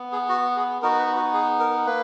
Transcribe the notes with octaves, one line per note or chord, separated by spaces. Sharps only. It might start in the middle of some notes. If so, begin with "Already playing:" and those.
Already playing: B3
G#4
F#4
G#4
B3 D#4 F#4 A#4
B4
F#4
G#4
A#4
A#3 B4